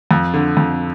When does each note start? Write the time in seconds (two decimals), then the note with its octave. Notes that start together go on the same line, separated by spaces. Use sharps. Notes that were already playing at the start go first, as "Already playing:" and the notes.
0.11 F2
0.34 D3
0.57 F2